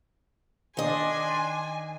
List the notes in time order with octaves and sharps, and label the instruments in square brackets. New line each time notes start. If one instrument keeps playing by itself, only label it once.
[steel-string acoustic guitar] D#3 D#5 [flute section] D4 C6 [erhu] G#5